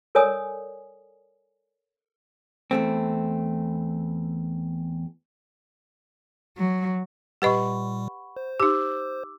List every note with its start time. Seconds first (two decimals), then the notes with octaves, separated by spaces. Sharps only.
0.15 A4 A#4 C#5 D5 G#5 D#6
2.71 E2 A3 C4
6.58 F#3
7.42 A#2 G3 G4 B4 D#5 F#5 B5 C#6
8.37 C5
8.60 D#4 G4 D6 E6